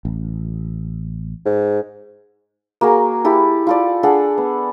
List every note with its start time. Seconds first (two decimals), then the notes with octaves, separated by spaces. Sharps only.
0.05 A1
1.46 G#2
2.81 A#3 F#4 G#4 A#4
3.25 E4 G4 A4
3.67 F4 A4 D5
4.03 D4 G#4 A4 F#5
4.38 B3